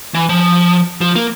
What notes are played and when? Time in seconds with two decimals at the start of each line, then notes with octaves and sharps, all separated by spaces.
0.14 E3
0.29 F3
1.01 F3
1.16 A#3